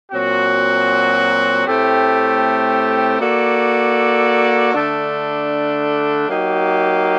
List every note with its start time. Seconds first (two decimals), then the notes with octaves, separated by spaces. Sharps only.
0.12 A#2 F#3 C4 F#4
1.66 A2 A3 C4 G4
3.20 A#3 F#4 A4 D5
4.73 D3 A3 D4
6.28 F#3 A#3 D#4 G4